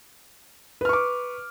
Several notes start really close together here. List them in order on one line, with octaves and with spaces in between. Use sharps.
B4 F6 C#6 D6